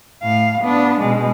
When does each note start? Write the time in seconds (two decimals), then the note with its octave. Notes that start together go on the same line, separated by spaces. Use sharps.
0.23 A2 F5
0.61 B3 D4
1.00 B2 G#3